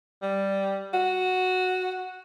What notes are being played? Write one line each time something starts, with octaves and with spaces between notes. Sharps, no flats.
G3
F#4